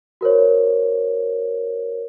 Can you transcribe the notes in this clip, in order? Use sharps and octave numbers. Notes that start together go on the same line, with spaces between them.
F#4 A#4 C5 C#5